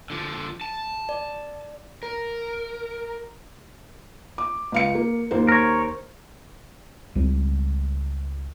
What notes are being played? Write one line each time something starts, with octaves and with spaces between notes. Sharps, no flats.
D3 F3
A5
D5
A#4
D6
C#2 F5 C#7
A#3
D#2 A#3 C5
A#4 C#5
C#2 G3 C4